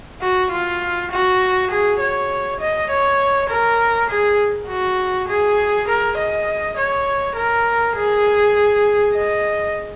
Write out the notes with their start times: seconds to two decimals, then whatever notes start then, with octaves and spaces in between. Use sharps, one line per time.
0.21 F#4
0.51 F4
1.11 F#4
1.71 G#4
2.00 C#5
2.60 D#5
2.90 C#5
3.49 A#4
4.09 G#4
4.68 F#4
5.28 G#4
5.88 A#4
6.17 D#5
6.77 C#5
7.36 A#4
7.96 G#4
9.15 D#5